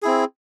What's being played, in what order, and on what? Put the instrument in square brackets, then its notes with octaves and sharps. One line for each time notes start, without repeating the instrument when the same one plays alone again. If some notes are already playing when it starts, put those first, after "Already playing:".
[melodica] C4 E4 G#4